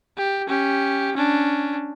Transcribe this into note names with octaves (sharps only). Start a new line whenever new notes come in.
G4
C#4 G4
C#4 D4